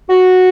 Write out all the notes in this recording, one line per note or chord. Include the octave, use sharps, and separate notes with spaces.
F#4